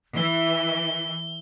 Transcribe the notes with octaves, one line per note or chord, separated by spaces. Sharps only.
E3 E4 G7